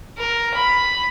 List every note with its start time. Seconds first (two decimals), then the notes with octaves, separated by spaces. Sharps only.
0.18 A#4
0.54 B5